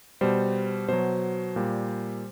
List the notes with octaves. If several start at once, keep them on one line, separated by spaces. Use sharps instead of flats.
B2 G3 C5
B2 F#3 C5
A#2 G3